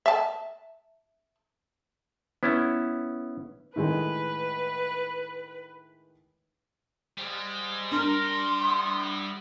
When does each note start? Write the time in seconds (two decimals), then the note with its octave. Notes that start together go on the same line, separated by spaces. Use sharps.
0.06 E5 A5
2.43 B3 C#4 E4
3.76 A2 D#3 G#3 B4
7.18 G#2 G3
7.92 D4 A#4 C6
8.61 A2 B3